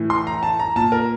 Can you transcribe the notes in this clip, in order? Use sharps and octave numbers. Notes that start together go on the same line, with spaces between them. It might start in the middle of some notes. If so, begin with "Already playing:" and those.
Already playing: A2 E3
C6
A#5
A5
A#5
A#2 A5
A#4